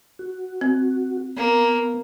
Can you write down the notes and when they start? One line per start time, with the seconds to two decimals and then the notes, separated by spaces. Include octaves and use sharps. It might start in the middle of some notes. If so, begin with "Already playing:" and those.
0.19 F#4
0.61 C4
1.36 A#3 B3